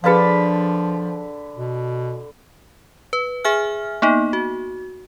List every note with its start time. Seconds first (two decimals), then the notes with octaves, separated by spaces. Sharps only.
0.04 D3 F3 G#4 B4 F5 A5 B5
1.56 B2
3.13 B4
3.44 G#4 E5 G#5 F6
4.02 A#3 B3 D#4
4.33 F#4